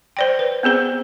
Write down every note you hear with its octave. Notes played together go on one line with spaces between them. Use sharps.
C5 D5 G5
B4
B3 C4 G#4 C5